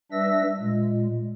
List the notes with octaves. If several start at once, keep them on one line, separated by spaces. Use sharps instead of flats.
G3 D4 B4 E5 E6 A#6
A#2 G#3